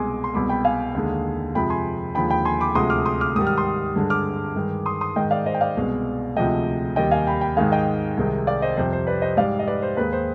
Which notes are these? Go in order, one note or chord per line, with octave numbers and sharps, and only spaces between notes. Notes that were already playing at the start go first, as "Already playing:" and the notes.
Already playing: C2 B2 G#3 G#5 C6 D6
C6
C2 B2 G#3 B5 D6
G5 B5
F5 G#5
D#2 D3 G#3
F2 C3 F3 G#3 G5 B5
G#5 C6
D#2 D3 F3 G#3 G5 B5
G5 B5
G#5 C6
B5 D6
D2 C3 F3 G#3 C6 D#6
D6 F6
C6 D#6
D6 F6
G#2 D#3 G3 D#6
F6
C6 D#6
G2 D3 G#3
D6 F6
G2 D#3 G#3
C6 D#6
C6 D#6
G#2 D#3 G#3 D#5 G5
D5 F5
C5 D#5
G5
D5 F5
C2 B2 G#3
D2 C3 F3 G#3 D#5 G5
D#2 D#3 G3 D#5 G5
F5 G#5
G5 B5
G5 B5
G#2 D#3 G#3 F5 G#5
D#5 G5
C2 C3 D#3 G#3
D5 F5
C5 D#5
F2 C3 G3 C5
C5
B4 D5
C5 D#5
G#2 G3 D5 F5
D#5
B4 D5
C5
D#2 D#3 G#3 B4
C5